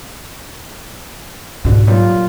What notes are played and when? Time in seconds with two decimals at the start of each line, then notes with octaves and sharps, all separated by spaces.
1.65 C#2 G#2 B2 D3
1.87 A#2 F#3 G3 F4